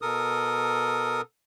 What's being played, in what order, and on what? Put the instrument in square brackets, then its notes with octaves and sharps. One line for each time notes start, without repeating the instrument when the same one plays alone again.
[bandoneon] B2 A4 A#4 D#6